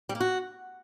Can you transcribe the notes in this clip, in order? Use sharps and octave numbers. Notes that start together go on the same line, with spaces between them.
G3
A#3
F#4